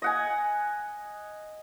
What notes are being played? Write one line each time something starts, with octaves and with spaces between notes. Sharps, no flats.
D#5 F#5 G#5